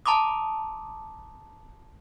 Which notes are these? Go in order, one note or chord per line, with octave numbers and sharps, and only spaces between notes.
A5 A#5 C6 D6 D#6